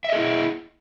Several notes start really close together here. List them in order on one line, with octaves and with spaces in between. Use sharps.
E5 D#5 G#4 E4